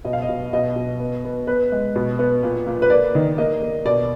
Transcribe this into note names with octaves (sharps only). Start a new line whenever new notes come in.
B2 D#5
F5
D#5
B2
B2 D#5
B2
B3
B3
B3 B4
G#3
B2
B3
A#2
A#2
B4
A#3 D5
D#3
A#3 D#5
A#3
B2 D5